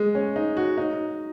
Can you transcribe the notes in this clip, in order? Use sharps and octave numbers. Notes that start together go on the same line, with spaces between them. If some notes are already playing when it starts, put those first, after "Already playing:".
Already playing: G#3
C#4
D#4
F#4
D#4